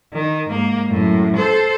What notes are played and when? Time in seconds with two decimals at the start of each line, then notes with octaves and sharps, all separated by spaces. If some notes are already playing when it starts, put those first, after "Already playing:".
0.13 D#3
0.49 G#2 A#3
0.89 F#2 A2
1.36 A4 C5